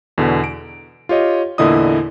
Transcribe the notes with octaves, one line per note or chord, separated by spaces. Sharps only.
E2 B2 D3
D7
F4 G4 C#5 D#5
E2 A#2 D3 E4 D#5 D#6